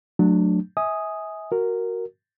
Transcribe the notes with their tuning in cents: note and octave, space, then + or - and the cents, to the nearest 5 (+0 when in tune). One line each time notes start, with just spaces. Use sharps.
F#3 -15 A3 -10 D4 +10
E5 -40 G#5 +0 D#6 +0
F#4 +0 A#4 -5